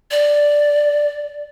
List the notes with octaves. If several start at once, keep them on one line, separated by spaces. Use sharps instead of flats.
D5